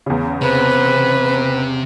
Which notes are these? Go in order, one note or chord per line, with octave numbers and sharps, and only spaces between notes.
E2 C#3
C3 B4 C5